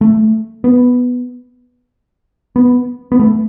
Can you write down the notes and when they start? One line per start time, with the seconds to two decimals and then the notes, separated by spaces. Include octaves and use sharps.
0.01 A3
0.64 B3
2.56 B3
3.12 B3
3.19 A3